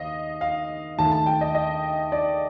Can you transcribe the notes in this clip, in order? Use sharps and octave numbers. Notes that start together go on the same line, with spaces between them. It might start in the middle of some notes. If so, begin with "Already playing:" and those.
Already playing: D#2 A#3 D#5 F5
F5
D#2 D#3 A3 A5
A5
G5
D#5
D#5
D5